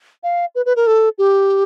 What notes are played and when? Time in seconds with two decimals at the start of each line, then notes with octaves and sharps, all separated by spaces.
0.23 F5
0.55 B4
0.66 B4
0.76 A#4
0.87 A4
1.18 G4